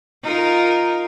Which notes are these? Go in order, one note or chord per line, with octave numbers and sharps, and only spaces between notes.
D#4 F4 A#4